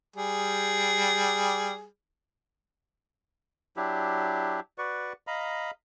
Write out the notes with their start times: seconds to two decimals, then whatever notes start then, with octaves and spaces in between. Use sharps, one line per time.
0.16 G3 G#4
3.77 F#3 D4 E4 G4
4.78 F#4 B4 D5 C#6
5.27 D#5 F5 A#5 B5